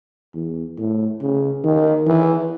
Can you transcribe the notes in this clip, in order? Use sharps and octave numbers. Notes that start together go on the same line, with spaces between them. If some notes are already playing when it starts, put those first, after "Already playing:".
E2
A2
C#3
D#3
E3